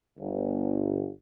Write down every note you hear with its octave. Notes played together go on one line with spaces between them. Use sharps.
G1